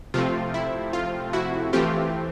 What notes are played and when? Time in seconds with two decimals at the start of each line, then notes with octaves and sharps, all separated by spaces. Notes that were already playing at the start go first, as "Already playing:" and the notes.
0.14 C3 F3 A3 C4 F4
0.54 E4
0.93 F4
1.33 E4 F#4
1.73 E3 A3 C4 F4 G4